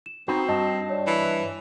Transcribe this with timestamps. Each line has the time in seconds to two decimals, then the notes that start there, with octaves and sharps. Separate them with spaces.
0.06 E7
0.28 B3 C4 D#4 F#4 A#5
0.49 G2 D#5 A5
0.89 C#5 D5
1.07 E3